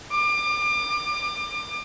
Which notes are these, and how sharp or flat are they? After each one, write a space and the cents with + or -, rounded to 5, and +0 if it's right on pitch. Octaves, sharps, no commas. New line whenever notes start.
D6 +35